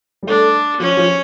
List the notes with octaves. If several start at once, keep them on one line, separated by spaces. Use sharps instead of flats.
G3
A3 D4
F3 C#4
F3